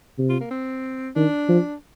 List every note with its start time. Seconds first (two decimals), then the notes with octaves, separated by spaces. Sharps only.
0.18 C3
0.30 F4
0.40 A#3
0.51 C4
1.16 D#3 D4
1.48 F3